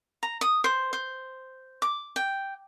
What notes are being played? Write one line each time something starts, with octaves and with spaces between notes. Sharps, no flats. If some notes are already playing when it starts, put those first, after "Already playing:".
A#5
D#6
C5
C5
D6
G5